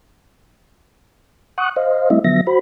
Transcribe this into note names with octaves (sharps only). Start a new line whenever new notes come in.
F#5 C#6 D#6 F#6
C5 D#5 F5
G3 A3 C4 E4 D#5 E5
D3 F3 F#3 B3 E5 A#6
F#4 C5 B5